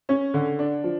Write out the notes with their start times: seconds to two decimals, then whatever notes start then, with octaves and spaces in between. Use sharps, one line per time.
0.09 C#4
0.34 D3
0.59 D4
0.84 F3